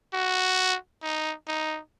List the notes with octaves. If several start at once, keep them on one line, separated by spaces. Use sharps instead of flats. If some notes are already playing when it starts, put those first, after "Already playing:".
F#4
D#4
D#4